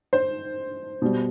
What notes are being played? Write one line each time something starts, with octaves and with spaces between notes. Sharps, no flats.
C5
B2 G3